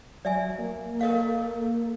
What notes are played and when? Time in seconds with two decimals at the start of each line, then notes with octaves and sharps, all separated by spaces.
0.25 F#3 D5 E5 G#5
0.59 A#3
1.01 A4 A#4 D#5 F5